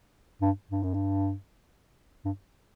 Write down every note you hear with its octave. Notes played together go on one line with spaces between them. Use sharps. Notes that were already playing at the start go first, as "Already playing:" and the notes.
G2
G2
F#2
G2
G2